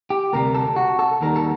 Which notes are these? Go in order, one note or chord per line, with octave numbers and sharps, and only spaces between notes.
G4
D2 C3 G3 A#4
A4
F#4
A4
D#2 D#3 G3 A#4
A4